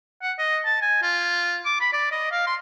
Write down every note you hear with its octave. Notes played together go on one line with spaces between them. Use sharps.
F#5
D#5
A5
G#5
F4
D6
B5
D5
D#5
F5
C6